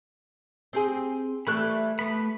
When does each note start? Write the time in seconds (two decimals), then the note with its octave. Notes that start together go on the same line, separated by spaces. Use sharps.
0.73 C4 G4 G#4
1.47 E3 G3 A3 B5 F#6
1.99 A3 B3 B5